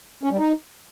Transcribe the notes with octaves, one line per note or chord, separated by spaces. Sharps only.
C#4
G3
D#4